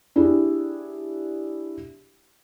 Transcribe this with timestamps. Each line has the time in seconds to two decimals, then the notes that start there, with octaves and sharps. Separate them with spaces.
0.16 D4 E4 G4 G#4